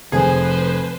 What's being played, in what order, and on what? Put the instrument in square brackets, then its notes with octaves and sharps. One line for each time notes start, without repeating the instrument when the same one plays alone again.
[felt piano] F1 [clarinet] F3 [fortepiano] G#4 [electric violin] B4 C5